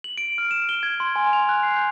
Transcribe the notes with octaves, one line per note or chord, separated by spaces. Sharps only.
F#7
D7
F6
E7
G7
G#6
C6
G#5
F7
F#6
C7
G6